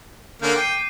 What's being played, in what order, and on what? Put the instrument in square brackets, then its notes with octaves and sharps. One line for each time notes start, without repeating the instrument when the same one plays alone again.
[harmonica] D3 A#3 C#4 [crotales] G6
[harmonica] G5 [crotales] D6 C7 D#7